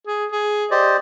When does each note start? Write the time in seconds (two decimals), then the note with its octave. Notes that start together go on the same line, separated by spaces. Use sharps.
0.07 G#4
0.32 G#4
0.71 G4 C5 D5 D#5